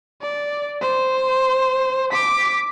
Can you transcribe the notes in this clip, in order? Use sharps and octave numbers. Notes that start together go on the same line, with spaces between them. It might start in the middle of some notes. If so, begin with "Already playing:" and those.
D5
C5
D6 B6